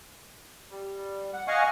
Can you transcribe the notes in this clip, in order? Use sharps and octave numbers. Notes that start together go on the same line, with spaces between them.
G3
F#5
D#5 F5 F#5 G#5 C#6